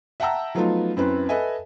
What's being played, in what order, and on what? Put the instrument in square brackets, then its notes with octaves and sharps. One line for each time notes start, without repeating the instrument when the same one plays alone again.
[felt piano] E5 F#5 G5 A5 A#5 E6
F3 F#3 A3 B3 D#4 F4
F#2 C4 E4 B4
A4 B4 D#5 E5 G#5